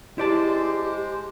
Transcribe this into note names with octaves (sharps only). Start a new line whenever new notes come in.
G#3 E4 G4 C5 D5 A5